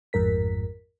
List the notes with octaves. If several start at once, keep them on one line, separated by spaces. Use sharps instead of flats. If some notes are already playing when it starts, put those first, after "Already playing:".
A1 F2 G#2 A#4 B6